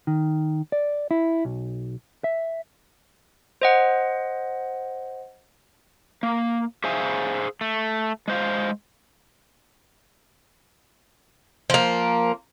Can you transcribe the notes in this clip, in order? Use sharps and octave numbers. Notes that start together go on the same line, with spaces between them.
D#3
D5
E4
B1
E5
C5 D#5 F#5
A#3
G#4 C5 E5 F5 G#5
A3
G#3 C5 F5
F3 A#3